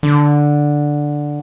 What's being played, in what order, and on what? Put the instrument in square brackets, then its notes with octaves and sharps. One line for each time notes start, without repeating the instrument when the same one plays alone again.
[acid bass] D3